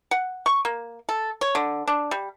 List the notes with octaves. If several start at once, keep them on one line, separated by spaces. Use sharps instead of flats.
F#5
C#6
A#3
A4
C#5
D3
D4
G3